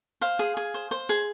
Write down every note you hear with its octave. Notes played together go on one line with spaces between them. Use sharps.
C5 F5
G#4
G#4
C5
C5
G#4